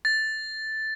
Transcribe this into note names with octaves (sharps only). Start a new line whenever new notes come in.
A6